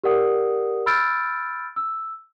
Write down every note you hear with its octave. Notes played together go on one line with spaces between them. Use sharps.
G4 A#4 D5 F#5 D#6
B5 E6 F6 G6 A6 D7
E6